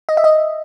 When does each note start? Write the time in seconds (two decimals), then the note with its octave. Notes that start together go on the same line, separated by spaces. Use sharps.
0.09 D#5
0.17 E5
0.24 D#5